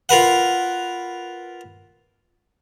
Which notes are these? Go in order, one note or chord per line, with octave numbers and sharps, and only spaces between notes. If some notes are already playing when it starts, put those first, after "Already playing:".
F4 A#4 B4 F#5